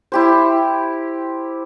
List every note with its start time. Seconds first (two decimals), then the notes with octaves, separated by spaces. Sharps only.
0.12 E4 G4 C5